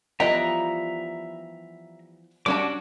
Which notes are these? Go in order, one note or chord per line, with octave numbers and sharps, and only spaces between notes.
E3 F3 G3 B3 D#5 E5 G5 A#5
G3 C#4 D4 F#4 A5 D6